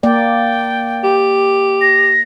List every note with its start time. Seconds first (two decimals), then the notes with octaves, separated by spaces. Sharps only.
0.03 A#3 D5 G5
1.04 G4
1.81 A#6